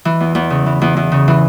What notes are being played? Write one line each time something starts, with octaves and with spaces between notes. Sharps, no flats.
E3
E2
E2
C#3
E3
E2
E2
C#3
E3